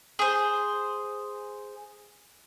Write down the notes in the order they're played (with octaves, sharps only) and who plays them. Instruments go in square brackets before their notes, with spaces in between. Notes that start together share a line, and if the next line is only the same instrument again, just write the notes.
[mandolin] G#4 C5